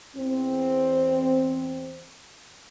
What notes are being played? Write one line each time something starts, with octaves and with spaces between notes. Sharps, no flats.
E2 C4